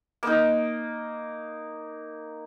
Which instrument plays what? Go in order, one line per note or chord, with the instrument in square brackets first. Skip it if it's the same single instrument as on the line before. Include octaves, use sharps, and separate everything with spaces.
[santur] A#3 D#4